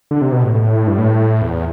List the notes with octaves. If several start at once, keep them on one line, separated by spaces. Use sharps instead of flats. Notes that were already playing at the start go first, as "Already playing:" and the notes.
D3
C3
B2
A2
A2
G2
A2
E2